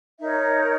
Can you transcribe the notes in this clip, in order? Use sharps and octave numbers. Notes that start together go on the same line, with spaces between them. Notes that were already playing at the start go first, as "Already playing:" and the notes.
D#4 A#4 C#5 E5